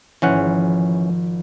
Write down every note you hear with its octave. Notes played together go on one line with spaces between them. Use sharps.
G#1 E3 F3 C#4 F#5